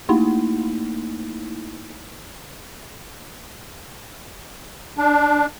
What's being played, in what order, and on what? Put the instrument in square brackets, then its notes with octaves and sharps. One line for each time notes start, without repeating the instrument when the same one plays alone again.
[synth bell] A3 A#3 D#4 E4
[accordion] D4